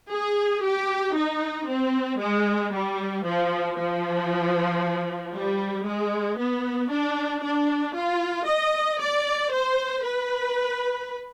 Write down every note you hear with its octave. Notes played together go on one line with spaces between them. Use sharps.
G#4
G4
D#4
C4
G#3
G3
F3
F3
G3
G#3
B3
D4
D4
F4
D#5
D5
C5
B4